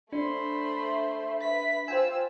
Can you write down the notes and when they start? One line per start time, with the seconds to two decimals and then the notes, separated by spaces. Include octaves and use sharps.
0.12 A3 D4 C5 B5 C6
0.85 E5
1.41 B4 B5 B6
1.88 F4 C5 G5 G#5 E6